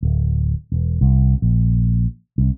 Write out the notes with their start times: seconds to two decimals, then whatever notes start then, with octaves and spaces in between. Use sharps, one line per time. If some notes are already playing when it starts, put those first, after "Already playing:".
0.03 D1
0.72 E1
1.01 C2
1.42 A#1
2.38 C2